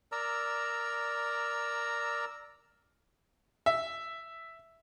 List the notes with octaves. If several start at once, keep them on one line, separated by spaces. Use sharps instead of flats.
A#4 D5 A#5 E6
E5